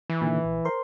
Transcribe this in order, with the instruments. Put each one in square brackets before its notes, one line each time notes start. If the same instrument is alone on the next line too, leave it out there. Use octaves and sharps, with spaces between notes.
[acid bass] E3
[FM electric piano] A#2 D3 D#3
A#1
A#4 C5 C6